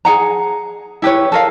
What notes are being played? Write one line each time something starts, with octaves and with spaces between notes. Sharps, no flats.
G#4 F#5 A#5
E4 G4 B4 C#5
A4 A#4 F5